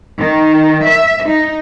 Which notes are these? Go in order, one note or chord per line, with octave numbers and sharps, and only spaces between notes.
D#3
E5
D#4